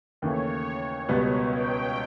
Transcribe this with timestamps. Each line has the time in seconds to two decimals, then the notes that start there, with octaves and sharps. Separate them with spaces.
0.22 D#2 C#3 E3 A3 C#5
1.08 C#2 B2 G3 B3
1.52 G5